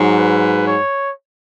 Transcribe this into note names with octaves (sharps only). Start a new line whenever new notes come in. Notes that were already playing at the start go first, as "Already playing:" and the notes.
Already playing: G#2 F#3
B4
C#5